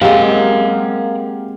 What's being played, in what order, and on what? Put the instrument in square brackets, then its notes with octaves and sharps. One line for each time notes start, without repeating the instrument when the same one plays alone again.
[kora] G#3 A#3 C4 [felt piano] G4 [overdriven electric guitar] A#4 F#5 [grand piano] F5